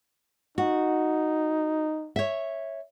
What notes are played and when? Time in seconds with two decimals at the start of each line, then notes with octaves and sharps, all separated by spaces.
0.58 D#4 F#4
2.16 C#5 E5